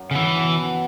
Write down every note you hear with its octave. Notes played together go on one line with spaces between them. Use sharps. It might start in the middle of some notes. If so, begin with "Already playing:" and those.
Already playing: F#2 F#3
C#3
E3 B3
B2
B2